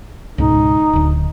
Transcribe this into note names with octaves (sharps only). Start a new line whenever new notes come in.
C#2 G#2 B2 D#4
D1 D2